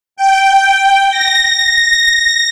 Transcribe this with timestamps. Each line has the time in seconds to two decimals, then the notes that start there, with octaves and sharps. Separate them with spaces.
0.16 G5
1.11 A#6